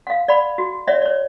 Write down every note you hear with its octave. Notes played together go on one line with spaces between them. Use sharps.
F5 F#5
D5 F#5 B5
F#4
C#5 D5 E5 F#5
C#5 D5